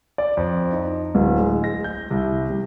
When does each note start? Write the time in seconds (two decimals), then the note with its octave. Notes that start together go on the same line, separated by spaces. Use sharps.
0.18 D5
0.37 F2
0.72 D#4
1.15 D1
1.39 G#3
1.64 A#6
1.84 G6
2.11 C2
2.50 G3